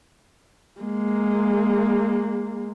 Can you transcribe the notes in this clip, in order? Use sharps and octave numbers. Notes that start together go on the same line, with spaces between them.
G#3 A#3